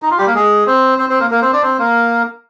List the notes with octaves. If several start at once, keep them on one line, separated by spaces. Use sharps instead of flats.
D#4
F4
G3 G4
A#3 A#4
G#3 G#4
C4 C5
C4 C5
C4 C5
A#3 A#4
A#3 A#4
C4 C5
D4 D5
C4 C5
A#3 A#4